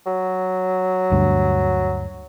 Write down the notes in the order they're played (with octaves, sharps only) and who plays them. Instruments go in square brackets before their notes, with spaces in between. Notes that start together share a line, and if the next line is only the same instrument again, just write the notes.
[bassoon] F#3
[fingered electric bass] D2 G2